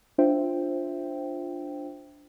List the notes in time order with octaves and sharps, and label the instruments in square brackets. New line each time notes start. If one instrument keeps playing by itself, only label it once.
[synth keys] D4 F4 C5 E5 G5